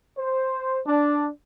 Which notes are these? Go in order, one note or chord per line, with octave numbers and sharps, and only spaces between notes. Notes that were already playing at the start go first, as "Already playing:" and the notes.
C5
D4